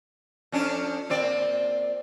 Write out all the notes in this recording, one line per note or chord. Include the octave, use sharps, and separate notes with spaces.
F2 C#4 D4
A#2 C4 D5